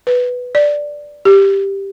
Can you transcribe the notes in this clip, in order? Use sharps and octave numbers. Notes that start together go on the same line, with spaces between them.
B4
D5
G4